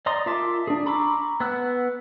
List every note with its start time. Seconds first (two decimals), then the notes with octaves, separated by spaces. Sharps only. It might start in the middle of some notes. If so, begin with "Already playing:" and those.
0.06 D5 D#5 A#5 C6 D#6
0.26 F4 A#4 E5 A5 D6
0.67 D4 G#4
0.86 A#5 B5 C#6 D6 E6
1.40 B3 F#5 E6 F#6